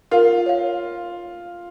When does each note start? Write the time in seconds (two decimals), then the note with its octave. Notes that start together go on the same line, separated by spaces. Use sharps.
0.11 F4 A#4
0.46 C#5 F5